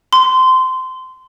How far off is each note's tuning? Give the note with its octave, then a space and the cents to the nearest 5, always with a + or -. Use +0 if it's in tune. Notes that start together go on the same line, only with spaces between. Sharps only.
C6 -20